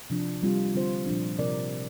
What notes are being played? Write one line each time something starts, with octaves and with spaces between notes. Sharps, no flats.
C3 F3 D4
G3 C4 F4
D3 G3 C4 F4 C5
A#2 F3 D4
C3 F3 C4 A#4 D5